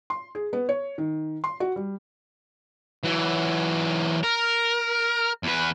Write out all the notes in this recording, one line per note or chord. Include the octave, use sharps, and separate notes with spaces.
C6
G#4
B3
C#5
D#3
C6
F#4
G3
E3 F#3
A#4
E2 B4